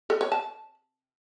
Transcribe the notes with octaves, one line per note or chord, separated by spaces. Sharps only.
A4
C#5
A5